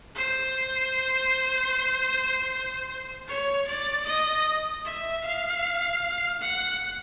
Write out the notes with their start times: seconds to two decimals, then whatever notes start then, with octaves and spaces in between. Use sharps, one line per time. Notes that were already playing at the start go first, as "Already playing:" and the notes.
0.15 C5
3.28 C#5
3.67 D5
4.07 D#5
4.85 E5
5.25 F5
6.41 F#5